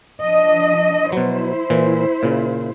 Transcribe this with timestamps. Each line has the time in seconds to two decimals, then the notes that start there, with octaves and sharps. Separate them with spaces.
0.23 F3 D4 D#5
1.12 B2 F#3 E4 C5
1.70 A#2 E3
2.23 A#2 C#3